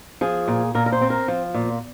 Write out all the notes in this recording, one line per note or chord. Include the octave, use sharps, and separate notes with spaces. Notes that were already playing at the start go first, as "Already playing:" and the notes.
F3 G#4
A#2
A#2 A#4
A#4
C5
C4
A#4
F3
A#2